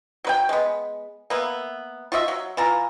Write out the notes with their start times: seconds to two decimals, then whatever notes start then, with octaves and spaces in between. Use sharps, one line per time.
0.24 F#3 B4 G5
0.49 G#3 B3
1.30 A#3 B3 E5
2.12 F4 F#4 D#5 E5
2.28 F#3
2.57 E3 F4 A#5